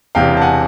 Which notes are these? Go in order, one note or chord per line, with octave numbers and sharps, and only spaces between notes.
E1 E2 C3 E3 F5 G5
A5
F#5 G#5